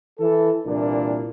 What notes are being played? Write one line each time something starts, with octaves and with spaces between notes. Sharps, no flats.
E3 A4
C2 A#2 E3 A#3 D4